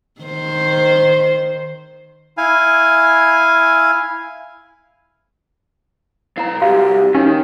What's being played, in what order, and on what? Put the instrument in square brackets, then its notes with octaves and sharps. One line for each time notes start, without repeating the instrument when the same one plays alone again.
[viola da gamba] D#3 C5
[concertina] E4 F5 G#5
[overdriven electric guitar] B2 F5 [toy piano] E4 A#5
[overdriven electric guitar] C2 [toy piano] F#4 F5 [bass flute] G4
[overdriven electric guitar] D#3 [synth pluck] C#4